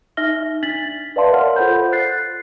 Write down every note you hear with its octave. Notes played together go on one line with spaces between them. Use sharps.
D#4 E5 F6 A#6 G7
D4 A6 B6 F#7
B4 D5 E5 F5 A5 C6
A#4 C#5 E5 F#5 C6 F6
F4 A4 C5 F#5 B5 G6
F#6 A6 C7